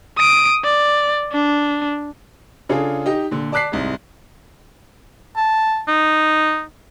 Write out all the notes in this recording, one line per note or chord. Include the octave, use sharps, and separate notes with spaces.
D#6 D7
D5
D4
C#3 D4 F4 G#4 A4
D#4 G4 D#5
A#2 D3
D5 A5 D6 F#6 B6 C7
C2 G#2
A5
D#4